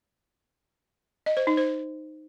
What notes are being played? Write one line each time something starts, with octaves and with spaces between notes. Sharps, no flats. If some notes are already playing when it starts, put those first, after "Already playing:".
D#5
C5
D#4
C5